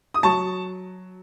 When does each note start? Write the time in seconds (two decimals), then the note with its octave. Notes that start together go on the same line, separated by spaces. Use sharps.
0.14 D#6
0.23 F#3 A5 C#6